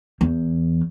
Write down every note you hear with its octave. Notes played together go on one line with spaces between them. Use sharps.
E2